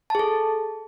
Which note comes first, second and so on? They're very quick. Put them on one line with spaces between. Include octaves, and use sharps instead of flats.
A5 G#4 A4